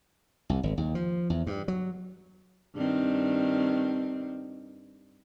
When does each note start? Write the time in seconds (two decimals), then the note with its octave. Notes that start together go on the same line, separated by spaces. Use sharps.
0.50 C2
0.63 G#1
0.78 D#2
0.95 F3
1.30 E2
1.47 G2
1.68 F#3
2.75 G2 D#3 C4